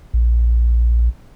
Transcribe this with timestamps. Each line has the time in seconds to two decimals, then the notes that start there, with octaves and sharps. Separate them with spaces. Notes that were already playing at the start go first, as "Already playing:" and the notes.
0.14 A#1